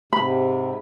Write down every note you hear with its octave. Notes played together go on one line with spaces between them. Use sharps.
G#2 C3 B5